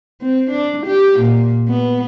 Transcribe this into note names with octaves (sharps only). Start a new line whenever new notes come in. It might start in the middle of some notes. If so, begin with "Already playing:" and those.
C4
D4
G4
A#2
B3